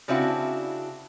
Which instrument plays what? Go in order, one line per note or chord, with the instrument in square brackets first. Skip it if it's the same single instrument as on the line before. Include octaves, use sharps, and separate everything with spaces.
[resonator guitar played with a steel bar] C#3 C4 D4 E4 F#4